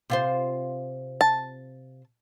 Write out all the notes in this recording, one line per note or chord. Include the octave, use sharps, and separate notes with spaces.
C3 F4 C5
A5